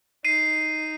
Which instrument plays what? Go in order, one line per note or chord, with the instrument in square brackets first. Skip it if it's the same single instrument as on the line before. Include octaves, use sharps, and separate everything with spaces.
[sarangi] D#4 [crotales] C7 D#7